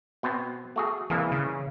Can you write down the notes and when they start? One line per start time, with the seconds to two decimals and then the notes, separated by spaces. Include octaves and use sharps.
0.23 B2 B3 C4
0.76 A3 F#4 G#4
1.10 C2 E3 A#3 G#4
1.32 C#3